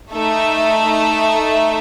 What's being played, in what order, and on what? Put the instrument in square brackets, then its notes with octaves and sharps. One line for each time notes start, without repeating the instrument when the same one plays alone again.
[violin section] A3 D#4 A4 E5